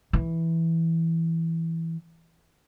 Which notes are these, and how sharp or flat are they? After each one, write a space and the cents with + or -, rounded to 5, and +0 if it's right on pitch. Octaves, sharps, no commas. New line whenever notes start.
E3 -5